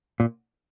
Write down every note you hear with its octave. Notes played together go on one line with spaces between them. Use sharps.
A#2